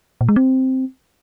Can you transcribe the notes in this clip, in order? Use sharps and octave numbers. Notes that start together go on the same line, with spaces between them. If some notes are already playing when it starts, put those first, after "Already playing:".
A#2
G#3
C4